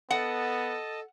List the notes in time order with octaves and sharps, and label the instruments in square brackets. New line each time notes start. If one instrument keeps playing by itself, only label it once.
[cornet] B3 [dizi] A4 [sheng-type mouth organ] D#5 A5 [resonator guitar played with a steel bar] F#5